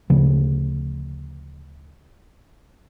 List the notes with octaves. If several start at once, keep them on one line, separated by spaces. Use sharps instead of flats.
D2 C#3 F3